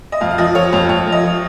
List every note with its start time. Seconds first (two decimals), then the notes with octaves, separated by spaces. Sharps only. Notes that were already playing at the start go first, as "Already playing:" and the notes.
0.12 D#5
0.21 F2 F5
0.31 F5
0.38 F3 D#5
0.55 F3 C#5
0.72 F2 C#5
0.89 F2 C#5
1.06 F3
1.12 D#5
1.24 F3